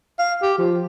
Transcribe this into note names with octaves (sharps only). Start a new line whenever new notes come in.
F5
G4
F3